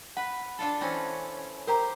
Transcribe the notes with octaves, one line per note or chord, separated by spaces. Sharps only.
B4 F#5
D4 F4 A4
E3 C4 C#4
G4 A#4 C5 A#5